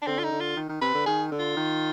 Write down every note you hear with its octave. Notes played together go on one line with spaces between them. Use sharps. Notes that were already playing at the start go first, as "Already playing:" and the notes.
D4
D3 C4
F4
D#4
D3
F4
D#3
D#3
C3 B4
D3
D#3 G#4
D3
F4
D#3